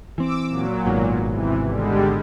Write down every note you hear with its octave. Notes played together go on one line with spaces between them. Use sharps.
E3 C4 D6 E6
A#2 F#3
G#1 G#2 B2
C3 E3
D3 G3 G#3